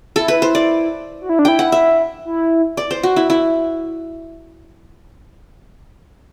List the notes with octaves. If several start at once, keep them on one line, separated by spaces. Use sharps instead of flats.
E4 A4
B4
C5
D5
F#4
E4
D4
E4 G5
F#5
E5
E4
D5
C5
F#4
E4
E4